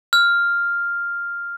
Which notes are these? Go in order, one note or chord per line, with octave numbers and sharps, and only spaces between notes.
F6